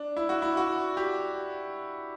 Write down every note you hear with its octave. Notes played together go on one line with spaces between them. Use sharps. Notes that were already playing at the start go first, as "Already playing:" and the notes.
Already playing: D4
E4
F#4
E4
F#4
G4